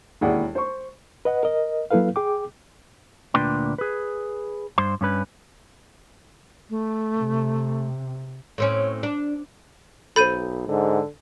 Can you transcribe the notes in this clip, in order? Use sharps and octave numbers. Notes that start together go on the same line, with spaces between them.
E1 D#2 E4 G#4 D5 F#5
C5 C#6
B4 D#5 F#5
A#4 D#5
F#3 A#3 E4 A4 B4 F5
G#4 G5 D6
D2 A#2 D4 B4 G5 C6
G#4 B4
G2 C5 C6
G2 C#4 B4
A3
C3
A2 C4 C#4
D4
B1 A4 C5 B5 G6 D#7
G#2 D3